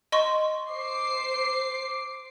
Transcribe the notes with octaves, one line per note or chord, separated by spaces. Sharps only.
D#5 C6 C#6
C5 D6 C7